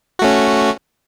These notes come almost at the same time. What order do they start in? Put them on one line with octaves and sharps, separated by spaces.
F#4 A3 C#4